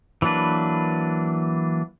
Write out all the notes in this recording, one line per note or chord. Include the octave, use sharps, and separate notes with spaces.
E3 F#3 A#3 D4 B4